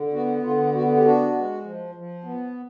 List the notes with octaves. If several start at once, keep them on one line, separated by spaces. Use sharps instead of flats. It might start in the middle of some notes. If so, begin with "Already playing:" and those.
Already playing: D3
B3 F#4
D3 F4
B3 F#4
G4
D4 F#4
G#3
F3
F3
B3